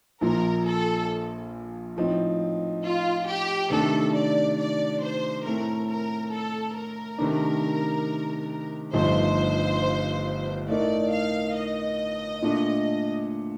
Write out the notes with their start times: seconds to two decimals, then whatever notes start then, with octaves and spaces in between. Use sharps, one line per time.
0.21 A#1 A#2 F3 A#4
0.66 A4
1.97 A2 F3 C4 D#4
2.84 F4
3.27 G4
3.70 C3 D#3 A3 D4 A4
4.15 D5
4.58 D5
5.02 C5
5.44 A2 A3 C4 A#4
5.88 A#4
6.32 A4
6.75 A#4
7.18 C3 D#3 A3 D4
8.93 G1 G2 F3 A3 D#4 C5
10.67 A2 A3 D#4 A#4 D5
11.11 F5
11.54 D#5
12.42 A#2 A3 D4